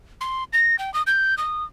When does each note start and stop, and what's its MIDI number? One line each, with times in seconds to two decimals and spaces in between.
0.21 0.44 84
0.53 0.76 94
0.79 0.93 79
0.94 1.02 87
1.07 1.35 91
1.38 1.64 87